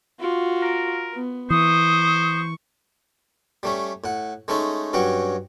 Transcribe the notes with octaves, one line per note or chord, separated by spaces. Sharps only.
F4 F#4
A#4
B3
E3 C5 C#6 D#6
G3 A3 C#4
A2 F#5
G#3 A3 C#4 D#4 A4
G2 F#3 C#4 F#5 G5